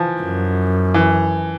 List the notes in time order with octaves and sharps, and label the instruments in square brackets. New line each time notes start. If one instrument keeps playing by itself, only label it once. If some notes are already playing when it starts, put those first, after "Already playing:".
Already playing: [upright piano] E3 F3
[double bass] F#2
[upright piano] E3